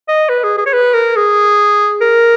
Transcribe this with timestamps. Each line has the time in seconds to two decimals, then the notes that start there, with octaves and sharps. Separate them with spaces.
0.09 D#5
0.29 B4
0.44 G#4
0.58 G#4
0.66 C#5
0.73 B4
0.94 A#4
1.16 G#4
2.01 A#4